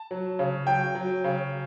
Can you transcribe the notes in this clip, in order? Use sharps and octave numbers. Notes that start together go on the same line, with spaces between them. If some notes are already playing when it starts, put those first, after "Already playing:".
Already playing: A5
F#3
C#3
F#3 G5
F#3
C#3